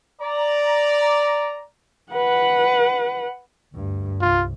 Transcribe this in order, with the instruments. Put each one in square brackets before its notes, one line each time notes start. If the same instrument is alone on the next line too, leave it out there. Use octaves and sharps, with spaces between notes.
[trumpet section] D5 A#5
[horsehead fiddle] B4 F#5
[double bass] D2 G2
[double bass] C2 [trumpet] F4